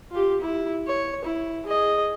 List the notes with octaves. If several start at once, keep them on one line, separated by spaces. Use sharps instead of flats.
F4 G4
E4
C#5
E4
G#4 D#5